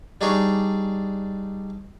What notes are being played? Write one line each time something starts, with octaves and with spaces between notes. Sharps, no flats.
G3 D4 D#4 G#4 C#5